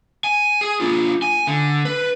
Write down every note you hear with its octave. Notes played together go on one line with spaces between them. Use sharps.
G#5
G#4
D4 F4
G#5
D3
B4